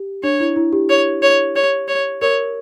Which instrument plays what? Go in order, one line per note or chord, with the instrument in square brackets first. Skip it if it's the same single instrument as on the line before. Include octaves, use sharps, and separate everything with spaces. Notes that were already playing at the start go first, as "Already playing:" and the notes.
Already playing: [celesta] G4
[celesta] D4 [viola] C#5
[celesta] E4
E4
G4
[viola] C#5
C#5
C#5
C#5
[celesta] A#4 [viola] C#5